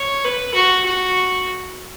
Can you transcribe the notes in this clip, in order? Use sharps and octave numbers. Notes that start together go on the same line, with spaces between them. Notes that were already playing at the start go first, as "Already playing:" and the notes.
Already playing: C#5
B4
F#4
F#4